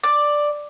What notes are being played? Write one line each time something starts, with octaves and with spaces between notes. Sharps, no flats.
D5